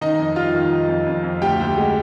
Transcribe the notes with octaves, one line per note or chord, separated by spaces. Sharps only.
D#3 D#4 D#5
F2
G3 F4 F5
D#3
D#3
F2
F2
F2
D2 G4 G5
D2
G#3